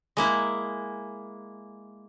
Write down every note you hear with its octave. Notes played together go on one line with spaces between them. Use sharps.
G#3 A#3 E4